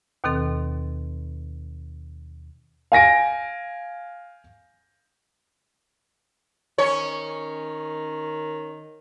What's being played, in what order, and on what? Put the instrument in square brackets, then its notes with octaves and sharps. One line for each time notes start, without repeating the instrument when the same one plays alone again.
[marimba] D#2 B2 D#3 C4 A4
[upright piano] F5 G#5 A#6 D7
[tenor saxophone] D#3 [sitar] C#4 C#5